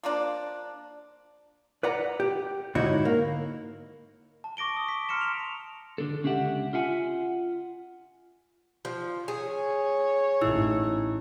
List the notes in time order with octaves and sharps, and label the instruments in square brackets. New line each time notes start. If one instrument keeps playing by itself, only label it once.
[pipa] F3 A#3 D4
[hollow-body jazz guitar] B4 D5 F#5 A#5
G4
G#2 D3 D#4 E4 F#4 C#5
A#3
[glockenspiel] A5
C#6 D6 A#6 D7 G7
D#6
B6
A#5 C6 F6 C#7 D7 E7
F7
[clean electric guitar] D3 A4
C#2 C#4 D4 G4 E5 F#5
F4 E5 F#5 G#5
[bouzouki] F3
[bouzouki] G#4 [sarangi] C#5
[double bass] A1 [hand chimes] D#4 E4 E6